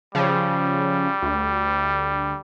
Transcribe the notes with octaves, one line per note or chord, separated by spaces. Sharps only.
C#3 F3 G3
D2